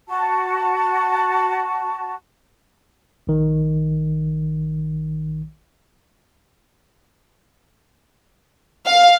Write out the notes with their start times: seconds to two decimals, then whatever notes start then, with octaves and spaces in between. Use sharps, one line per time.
0.08 F#4 A5
3.27 A#1 D#3
8.86 F5